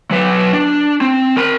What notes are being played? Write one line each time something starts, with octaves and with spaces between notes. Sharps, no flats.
F#3 B4
D4
C4
A#4 B5